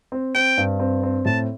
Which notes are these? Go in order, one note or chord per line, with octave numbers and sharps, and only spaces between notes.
C4
C4 G5
G2
C4
C4
A2 A5